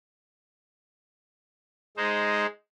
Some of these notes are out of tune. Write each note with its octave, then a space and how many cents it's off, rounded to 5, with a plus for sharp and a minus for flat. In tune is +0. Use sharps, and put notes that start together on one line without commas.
G#3 +0 D#4 +0 C5 +0